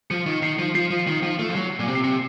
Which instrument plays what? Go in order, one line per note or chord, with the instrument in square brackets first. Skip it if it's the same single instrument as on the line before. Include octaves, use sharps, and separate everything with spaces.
[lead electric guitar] F3 [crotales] C#7
[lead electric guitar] D#3
[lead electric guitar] D#3 [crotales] C7
[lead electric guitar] F3
[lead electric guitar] F3 [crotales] C7
[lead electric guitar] F3
D#3
F3
A3
F3
F#3
A#2
C3
[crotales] C7
[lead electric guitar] C3 [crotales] C#7